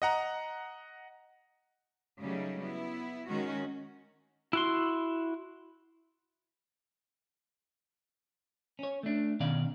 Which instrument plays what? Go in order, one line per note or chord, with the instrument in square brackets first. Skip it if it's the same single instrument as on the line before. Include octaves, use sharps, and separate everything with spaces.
[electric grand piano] D#5 F#5 A#5
[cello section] C#3 F#3 G3 A3 D#4
B3 E4
D#3 G#3 C#4 F#4
[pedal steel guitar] E4 F#4 C6
[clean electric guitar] C#4 C#5
A3 D4
B2 D#3 C#4 D5 F5